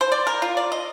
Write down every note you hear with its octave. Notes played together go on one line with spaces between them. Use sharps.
C5
D5
A#4
F4
D5
D#5